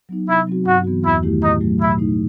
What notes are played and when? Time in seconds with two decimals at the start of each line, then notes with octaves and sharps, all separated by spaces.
0.09 F#3 B3 D#4
0.27 C3 E4
0.47 F#3 C4 F#4
0.65 G2 F#4
0.84 E3 B3 F#4
1.04 E2 E4
1.22 D#3 A3 E4 G4
1.42 A2 D#4
1.61 F#3 A3
1.80 B2 E4
1.98 A3 D#4